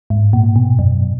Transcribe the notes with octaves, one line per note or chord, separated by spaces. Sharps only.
G#2
A#2
B2
F#2